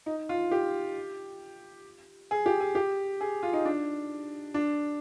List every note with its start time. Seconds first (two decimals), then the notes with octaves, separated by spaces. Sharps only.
0.06 D#4
0.29 F4
0.51 G4
2.31 G#4
2.46 G4
2.60 G#4
2.75 G4
3.21 G#4
3.43 F4
3.53 D#4
3.65 D4
4.54 D4